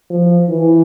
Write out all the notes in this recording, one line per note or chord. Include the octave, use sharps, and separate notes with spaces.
F3
E3